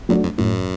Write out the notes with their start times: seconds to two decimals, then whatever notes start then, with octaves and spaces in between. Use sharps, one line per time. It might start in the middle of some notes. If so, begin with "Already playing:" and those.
0.09 F#2 F#3 A3 D4
0.24 F2
0.38 F#2 A2